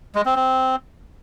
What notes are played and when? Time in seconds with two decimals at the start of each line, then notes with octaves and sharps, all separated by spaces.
0.15 G#3
0.26 C4
0.36 C4